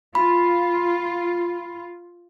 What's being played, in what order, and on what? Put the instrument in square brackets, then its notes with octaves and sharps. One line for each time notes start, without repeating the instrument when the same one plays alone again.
[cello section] F4 [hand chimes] B5